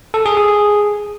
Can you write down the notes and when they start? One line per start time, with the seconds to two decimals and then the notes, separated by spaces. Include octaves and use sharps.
0.14 A4
0.26 G#4
0.37 G#4